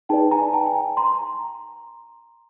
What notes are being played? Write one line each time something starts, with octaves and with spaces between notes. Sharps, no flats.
D#4 G#4 B4 D5 G5 A5
G#5 A#5
G5 A5
G#5
G5
A#5 C6